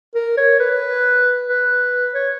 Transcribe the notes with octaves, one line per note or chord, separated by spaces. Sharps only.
A#4
C#5
B4
B4
C#5